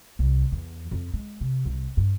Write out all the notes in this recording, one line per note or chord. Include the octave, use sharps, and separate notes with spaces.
C2
E2
F2
G#3
C3
C2
G2